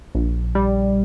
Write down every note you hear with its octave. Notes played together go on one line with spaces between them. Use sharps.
A#1
G3